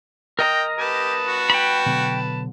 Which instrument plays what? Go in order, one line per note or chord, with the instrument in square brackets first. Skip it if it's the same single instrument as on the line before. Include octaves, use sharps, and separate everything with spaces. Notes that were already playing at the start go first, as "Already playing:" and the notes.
[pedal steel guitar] A#4 D#5 A#5 [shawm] G5
[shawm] G4 [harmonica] B4 A5
[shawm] F#4
[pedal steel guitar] G5 B5
[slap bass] B2 D3 F#3